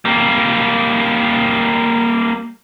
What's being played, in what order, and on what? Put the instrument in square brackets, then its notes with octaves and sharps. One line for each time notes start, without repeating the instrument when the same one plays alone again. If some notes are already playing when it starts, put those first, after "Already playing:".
[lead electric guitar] G3 A#3